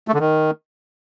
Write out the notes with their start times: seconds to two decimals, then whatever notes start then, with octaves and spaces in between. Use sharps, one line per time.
0.08 A3
0.14 D3
0.20 D#3